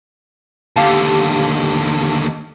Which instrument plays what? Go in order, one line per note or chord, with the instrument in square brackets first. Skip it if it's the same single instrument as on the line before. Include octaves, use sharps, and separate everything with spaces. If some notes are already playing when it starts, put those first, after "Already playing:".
[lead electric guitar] D#2 D3 [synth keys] G4 F5 A5